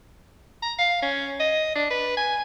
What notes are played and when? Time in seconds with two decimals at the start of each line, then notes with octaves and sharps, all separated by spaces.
0.63 A#5
0.78 F5
1.02 C#4
1.39 D#5
1.75 D4
1.90 B4
2.17 G#5